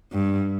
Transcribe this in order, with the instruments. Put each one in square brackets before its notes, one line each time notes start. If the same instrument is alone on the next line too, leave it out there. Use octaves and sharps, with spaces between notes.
[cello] G2